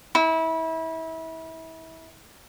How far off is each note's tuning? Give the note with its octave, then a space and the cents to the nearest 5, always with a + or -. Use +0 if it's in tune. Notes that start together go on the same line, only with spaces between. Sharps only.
E4 -30